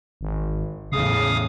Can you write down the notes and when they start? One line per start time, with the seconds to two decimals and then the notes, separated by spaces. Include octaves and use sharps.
0.21 G#1
0.92 E2 A2 C#3 F5 D#6